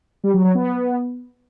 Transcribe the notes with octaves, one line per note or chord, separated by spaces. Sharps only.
G3
F#3
F#3
B3